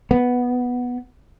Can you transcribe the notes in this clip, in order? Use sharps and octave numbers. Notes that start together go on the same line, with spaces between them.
B3